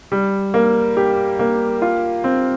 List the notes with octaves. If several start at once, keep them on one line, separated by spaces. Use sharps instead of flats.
G3
A#3
G4
A#3
F4
C4